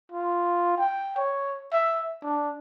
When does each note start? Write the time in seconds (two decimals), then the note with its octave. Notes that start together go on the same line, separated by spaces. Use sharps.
0.11 F4
0.78 G5
1.17 C#5
1.73 E5
2.22 D4